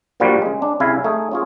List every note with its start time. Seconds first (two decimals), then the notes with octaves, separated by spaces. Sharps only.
0.20 G2 A#2 F3 G3 A#3 F#4
0.42 C#3 G#3
0.62 D4
0.80 C2 C#3 E4 F5 G#5
1.04 A3 D#4 G#4
1.31 C#4 F4 G#4